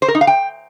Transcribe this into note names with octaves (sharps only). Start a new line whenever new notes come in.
C5
A#4
D#4
F5
G5